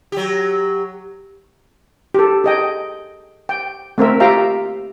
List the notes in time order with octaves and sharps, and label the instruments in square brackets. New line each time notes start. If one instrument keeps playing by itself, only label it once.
[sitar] F#3 G4
[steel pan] G4 A4
G#4 D#5 G5
G5
A3 C4 A#4 E5
F4 G4 E5 F5 G5 A#5